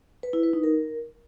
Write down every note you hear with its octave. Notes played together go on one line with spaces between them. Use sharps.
B4
E4
B4
D#4
A#4